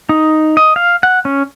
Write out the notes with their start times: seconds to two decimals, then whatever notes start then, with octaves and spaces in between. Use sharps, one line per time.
0.09 D#4
0.57 D#5
0.76 F5
1.03 F#5
1.25 C#4